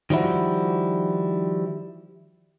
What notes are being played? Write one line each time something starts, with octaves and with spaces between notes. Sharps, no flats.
D#3 F3 G3 E4 F#4